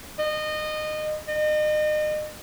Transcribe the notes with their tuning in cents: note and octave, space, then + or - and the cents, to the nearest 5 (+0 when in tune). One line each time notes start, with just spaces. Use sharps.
D#5 -25
D#5 -35